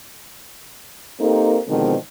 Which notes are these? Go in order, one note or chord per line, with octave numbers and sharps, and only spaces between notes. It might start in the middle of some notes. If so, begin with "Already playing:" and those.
A#3 C4 D#4 G4 A4 A#4
B2 D3 D#3 F3 G#3 C4